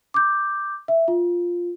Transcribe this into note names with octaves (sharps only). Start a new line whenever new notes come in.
D6 G6
E5
F4